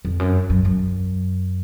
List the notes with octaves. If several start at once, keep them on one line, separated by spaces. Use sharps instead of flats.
F2
F#2
F#2
F#2